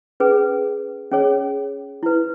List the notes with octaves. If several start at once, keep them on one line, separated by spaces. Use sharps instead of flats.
C#4 G#4 B4
C#4 G#4 C#5
E4 B4